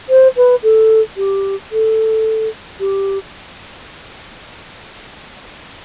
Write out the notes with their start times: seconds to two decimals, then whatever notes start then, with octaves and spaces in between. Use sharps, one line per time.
0.09 C5
0.36 B4
0.62 A4
1.17 G4
1.71 A4
2.80 G4